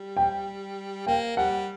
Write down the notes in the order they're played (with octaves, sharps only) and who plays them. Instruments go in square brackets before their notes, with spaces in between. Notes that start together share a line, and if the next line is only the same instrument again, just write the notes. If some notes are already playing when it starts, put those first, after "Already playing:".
Already playing: [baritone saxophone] G3
[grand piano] G5
[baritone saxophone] A#3 [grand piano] G5
[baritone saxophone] G3 [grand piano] F#5